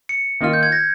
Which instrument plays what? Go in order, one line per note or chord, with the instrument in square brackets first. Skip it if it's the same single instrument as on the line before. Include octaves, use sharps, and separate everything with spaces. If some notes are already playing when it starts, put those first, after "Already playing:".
[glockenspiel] C#7
[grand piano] D#3 A#3 F4 [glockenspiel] F6
[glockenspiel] G6
G#6
A#6